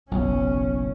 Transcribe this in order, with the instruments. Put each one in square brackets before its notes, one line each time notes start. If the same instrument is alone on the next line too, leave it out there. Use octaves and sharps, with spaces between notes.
[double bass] F#1 C#4 [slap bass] B1